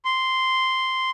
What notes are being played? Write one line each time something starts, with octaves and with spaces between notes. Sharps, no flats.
C6